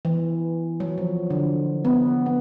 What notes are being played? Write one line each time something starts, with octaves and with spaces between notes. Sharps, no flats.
E3
F#3
F3
D3
B3
B3